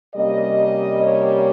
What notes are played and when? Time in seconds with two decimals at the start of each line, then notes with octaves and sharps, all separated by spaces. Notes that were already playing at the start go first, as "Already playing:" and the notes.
0.15 C3 G3 A#3 C#4 D#5
1.03 C#5